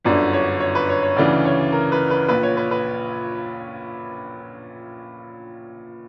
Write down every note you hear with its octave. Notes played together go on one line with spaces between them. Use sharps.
G1 F#2 D3 D5
C#5
C#5
B4
C#5
C#5
D2 C#3 E3 D5
C#5
A#4
B4
B4
A#1 A#2 B4
C#5
B4
B4